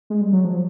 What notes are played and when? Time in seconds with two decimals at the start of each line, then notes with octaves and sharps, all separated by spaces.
0.10 G#3
0.21 G3
0.33 F#3
0.45 F3